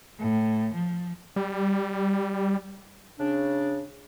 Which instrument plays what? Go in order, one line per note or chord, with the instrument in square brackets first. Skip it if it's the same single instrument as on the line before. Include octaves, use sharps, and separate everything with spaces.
[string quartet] A2
F3
[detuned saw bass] G3
[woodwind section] C#3 D4